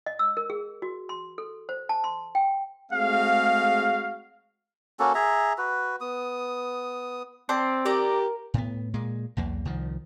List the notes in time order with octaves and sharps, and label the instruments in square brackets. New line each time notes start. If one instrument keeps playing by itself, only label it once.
[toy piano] D#5
E6
A#4
G#4
F#4
C6
A4
C5
A5
C6
G5
[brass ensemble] G#3 A3 C4 F#4 G#4 F5
[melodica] A#3 C#4 F#4 A4
G#4 E5 A#5
F#4 B4
B3 D#6
[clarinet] C4 [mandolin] C5 D5 A5
[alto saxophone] G4 [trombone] A#4 [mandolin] D5 A#5
[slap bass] A2 B3
A#2 G#3
B1 E2 A#3
C2 D#3 F3